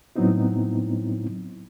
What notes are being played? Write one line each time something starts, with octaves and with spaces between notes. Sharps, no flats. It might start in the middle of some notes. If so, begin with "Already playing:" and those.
A2 F#3 B3 C4 D#4 E4